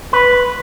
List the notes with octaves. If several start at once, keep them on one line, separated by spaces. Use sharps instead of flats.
B4